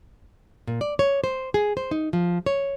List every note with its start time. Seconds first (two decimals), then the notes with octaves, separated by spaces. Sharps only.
0.67 A#2
0.81 D5
0.99 C#5
1.24 C5
1.54 G#4
1.77 C5
1.91 D#4
2.13 F3
2.46 C#5